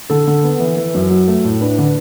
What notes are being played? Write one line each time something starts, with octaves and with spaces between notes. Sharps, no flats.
D3 A4
D3
B3
E3
E3
F#2
F#3
A3
A2
D4 B4
D3 B4